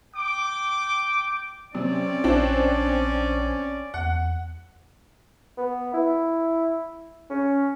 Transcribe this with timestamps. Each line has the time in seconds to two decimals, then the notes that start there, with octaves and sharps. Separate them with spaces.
0.15 G5 D6
1.75 C3 F#3 C#4 D5
2.24 A#1 C4 D4
3.94 E2 F#5
5.57 B3
5.93 E4
7.30 C#4